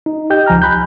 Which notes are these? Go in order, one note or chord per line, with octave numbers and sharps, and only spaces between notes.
D#4
G4 D#5 G5 G6
C#2 F3 G#5 A#5 F6
B5 F#6 G6